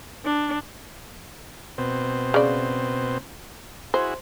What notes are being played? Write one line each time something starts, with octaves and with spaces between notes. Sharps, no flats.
D4
B2 C4
C#3 D5
E4 F#4 G#4 C5